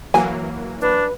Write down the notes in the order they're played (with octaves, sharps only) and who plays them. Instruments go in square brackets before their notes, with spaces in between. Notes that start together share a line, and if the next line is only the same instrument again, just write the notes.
[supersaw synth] E3 F#3 A#3 [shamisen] G#5
[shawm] D4 [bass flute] B4